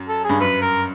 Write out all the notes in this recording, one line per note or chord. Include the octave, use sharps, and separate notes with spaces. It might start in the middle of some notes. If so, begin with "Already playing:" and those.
Already playing: F#2
A4
G#4
G2
F#2 B4
A#4